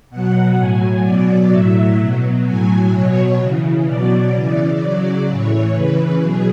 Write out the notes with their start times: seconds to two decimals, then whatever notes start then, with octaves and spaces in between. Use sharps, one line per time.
0.10 B2 F#3 F#5
0.57 A2 F#3 G#5
1.04 B2 F#3 D5
1.51 A2 F#3 E5
1.98 B2 F#3
2.45 A2 F#3 G#5
2.92 B2 F#3 C#5
3.39 C#3 E3
3.86 B2 F#3 D5
4.33 C#3 E3 D5
4.80 C#3 F#3
5.27 A2 E3 C#5
5.74 C#3 E3 B4
6.21 B2 F#3 G#4